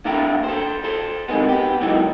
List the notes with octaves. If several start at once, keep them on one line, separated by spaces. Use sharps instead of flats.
A#3 D4 A4 E5 G5 A#5
A4 C5
A4 C5
C3 D#3 E3 G#3 B3
B3 G4
C#2 A#2 E3 F#3 D#4 A4